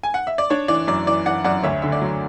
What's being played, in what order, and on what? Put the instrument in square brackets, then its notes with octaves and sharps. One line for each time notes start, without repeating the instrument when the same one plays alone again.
[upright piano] G#5
F#5
E5
D5
D4 C#5
E3 D5
F#2 D5
E3 D5
E3 D5 F#5
F#2 D5 F#5
D2 C#5 E5
D3 E5
D5
F#3